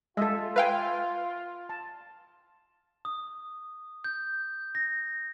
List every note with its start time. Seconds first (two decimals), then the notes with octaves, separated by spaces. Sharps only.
0.17 G#3 F4 A4 E5
0.56 B4 E5 F5 G5 G#5
1.69 A5
3.05 D#6
4.04 G6
4.75 A#6